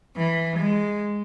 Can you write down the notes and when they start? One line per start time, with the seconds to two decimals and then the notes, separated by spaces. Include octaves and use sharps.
0.17 E3
0.60 G#3